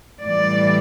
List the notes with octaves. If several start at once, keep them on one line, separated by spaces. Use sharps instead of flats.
A2 E3 G3 D5